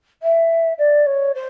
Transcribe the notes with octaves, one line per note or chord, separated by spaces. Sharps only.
E5
D5
C#5
C5